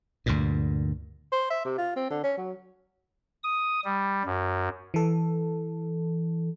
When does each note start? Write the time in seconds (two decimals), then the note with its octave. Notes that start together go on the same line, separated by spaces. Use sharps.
0.26 D2 G2 A#2
1.32 C5
1.50 E5
1.65 C3
1.78 F4
1.96 C4
2.11 D3
2.24 C#4
2.37 F#3
3.44 D#6
3.85 G3
4.25 F#2
4.94 E3 A4